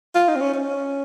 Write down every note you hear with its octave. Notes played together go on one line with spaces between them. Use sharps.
F4
D#4
C4
C#4
C#4